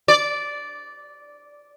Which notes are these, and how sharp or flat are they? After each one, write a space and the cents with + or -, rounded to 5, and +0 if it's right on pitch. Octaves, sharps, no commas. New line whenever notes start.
D5 -10